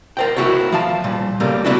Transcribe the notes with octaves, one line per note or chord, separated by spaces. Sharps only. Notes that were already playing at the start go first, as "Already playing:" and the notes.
A#4 C5 G5
A3 E4 F#4 A#4 C#5
F3 F5 A5
A#2 G3
C#3 G3 A3 A#3
B3 D4 E4 F#4 A4